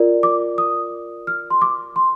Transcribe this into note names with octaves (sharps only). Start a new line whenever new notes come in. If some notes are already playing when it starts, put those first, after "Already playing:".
Already playing: F4 A#4 D5
D6
D#6
F6
C6
D6
C6